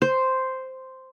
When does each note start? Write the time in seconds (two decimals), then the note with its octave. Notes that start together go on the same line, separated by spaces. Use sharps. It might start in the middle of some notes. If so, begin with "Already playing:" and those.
0.02 C5